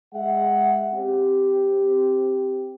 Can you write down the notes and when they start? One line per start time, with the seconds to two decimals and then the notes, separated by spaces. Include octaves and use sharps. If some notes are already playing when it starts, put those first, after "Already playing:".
0.14 G#3 E5 F#5
0.93 C4 G4